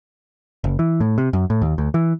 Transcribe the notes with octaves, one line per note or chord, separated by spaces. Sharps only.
F#1
E3
A2
C3
F#2
A2
D#2
D2
E3